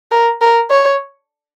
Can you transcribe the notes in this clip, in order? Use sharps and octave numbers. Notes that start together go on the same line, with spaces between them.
A#4
A#4
C#5